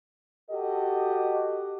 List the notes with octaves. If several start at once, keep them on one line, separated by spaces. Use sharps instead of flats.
F#4 G4 A4 D#5